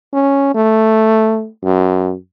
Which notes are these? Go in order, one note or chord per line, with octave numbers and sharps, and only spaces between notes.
C#4
A3
F#2